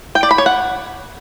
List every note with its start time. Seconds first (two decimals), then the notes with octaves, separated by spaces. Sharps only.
0.15 G5
0.23 D5
0.31 B5
0.38 C#5
0.46 F#5